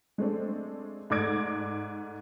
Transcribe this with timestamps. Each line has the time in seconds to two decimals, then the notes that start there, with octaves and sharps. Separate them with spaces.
0.18 G#3 A3 C4 D4
1.10 G#2 A3 D5 D6 G#6 D7